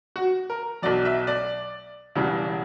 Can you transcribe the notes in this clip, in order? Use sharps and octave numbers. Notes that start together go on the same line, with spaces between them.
F#4
A#4
B1 B2 F#3 D5
E5
D5
E1 E2 C#3 E3 G3